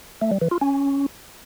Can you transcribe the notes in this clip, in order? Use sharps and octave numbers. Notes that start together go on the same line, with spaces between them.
A3
G3
E3
F4
C#4